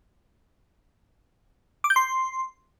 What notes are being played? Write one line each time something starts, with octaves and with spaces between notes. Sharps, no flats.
D6
G6
C6